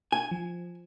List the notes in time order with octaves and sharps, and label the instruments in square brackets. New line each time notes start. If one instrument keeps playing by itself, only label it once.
[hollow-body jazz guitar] G#5
[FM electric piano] F3